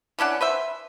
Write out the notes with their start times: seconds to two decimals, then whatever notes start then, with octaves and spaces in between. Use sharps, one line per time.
0.19 E3 C#4 D4 F#5
0.41 B4 C5 E5